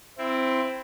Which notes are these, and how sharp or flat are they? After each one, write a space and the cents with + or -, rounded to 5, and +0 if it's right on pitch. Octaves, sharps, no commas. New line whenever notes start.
C4 +0 E4 +15